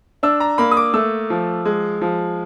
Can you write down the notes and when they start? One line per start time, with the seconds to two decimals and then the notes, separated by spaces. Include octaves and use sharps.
0.23 D4 E6
0.40 A#5
0.58 A#3 B5
0.71 D#6
0.77 D6
0.94 A3 E6
1.30 F3
1.65 G#3
2.01 F3